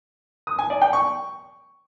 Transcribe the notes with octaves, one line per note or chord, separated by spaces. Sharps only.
D#6
G#5
D5
G5
C#6